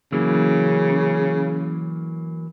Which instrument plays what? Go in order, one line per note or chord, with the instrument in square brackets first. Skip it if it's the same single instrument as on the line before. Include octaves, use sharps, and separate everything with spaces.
[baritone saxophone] C#3 [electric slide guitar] E3 F#3 A#3